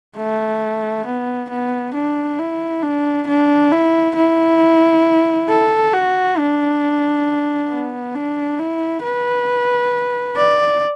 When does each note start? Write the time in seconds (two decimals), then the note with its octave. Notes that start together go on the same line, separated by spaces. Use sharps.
0.17 A3
1.06 B3
1.50 B3
1.95 D4
2.39 E4
2.83 D4
3.28 D4
3.72 E4
4.16 E4
5.49 A4
5.93 F#4
6.38 D4
7.70 B3
8.15 D4
8.59 E4
9.03 B4
10.37 D5